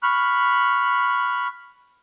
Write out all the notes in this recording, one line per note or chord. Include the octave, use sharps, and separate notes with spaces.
B5 C#6 F6 F#6